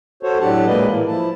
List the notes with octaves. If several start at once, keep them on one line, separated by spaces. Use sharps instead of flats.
F#4 A4 C5 C#5
A2 F#3 D4 G4 F#5 A5
A#2 G#3 A#3 B4 D5 D#5
A2 E3 A#3
F3 E4 A5